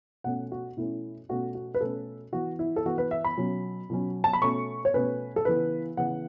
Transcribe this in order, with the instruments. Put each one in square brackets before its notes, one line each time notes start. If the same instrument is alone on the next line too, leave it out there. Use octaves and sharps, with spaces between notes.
[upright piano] B2 A3 C#4 F#5
F#4
B2 A3 C#4 E4
B2 A3 C#4 F#4
F#4
B4
B2 A3 C#4 A4
E3 B3 F#4
E4
A4
E3 B3 F#4
B4
E5
B5
B2 F#3 C#4
B2 F#3 C#4
A5
B5
B2 A3 C#4 C#6
C#5
B2 A3 C#4 B4
A4
C#3 E3 B3 B4
C#3 E3 B3 F#5